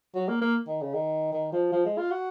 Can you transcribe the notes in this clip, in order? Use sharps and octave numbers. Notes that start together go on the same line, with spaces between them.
F#3
A#3
A#3
D#3
C#3
D#3
D#3
F3
F3
G#3
F4
F#4